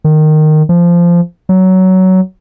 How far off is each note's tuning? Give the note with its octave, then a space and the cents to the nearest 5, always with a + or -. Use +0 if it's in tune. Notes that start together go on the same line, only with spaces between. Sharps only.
D#3 -15
F3 -15
F#3 +15